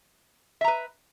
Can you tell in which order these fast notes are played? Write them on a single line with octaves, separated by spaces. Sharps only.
E5 A#5 B4